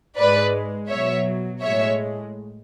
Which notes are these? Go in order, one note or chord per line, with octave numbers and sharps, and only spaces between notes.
G#2 G#3 B4 D5
B2 F#3 C#5 E5
A2 G#3 C#5 E5